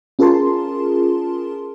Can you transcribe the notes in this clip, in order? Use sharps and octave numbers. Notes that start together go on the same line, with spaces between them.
C#4 F4 G#4 A#4 A5 C6